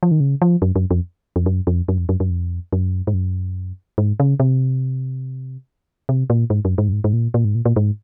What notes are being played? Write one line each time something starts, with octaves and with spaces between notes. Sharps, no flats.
F3
D#3
C#3
F3
F#2
F#2
F2
F2
F#2
F2
F#2
F2
F#2
F#2
F2
F#2
G#2
F#2
G#2
C#3
C3
C3
A#2
G#2
F#2
G#2
F#2
G#2
G#2
A#2
A#2
G#2
A#2
A#2
G#2